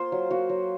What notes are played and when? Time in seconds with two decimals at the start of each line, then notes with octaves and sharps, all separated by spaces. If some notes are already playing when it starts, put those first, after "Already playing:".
Already playing: A#3 F4 C5
0.12 F#3
0.31 A#3 F#4
0.49 F#3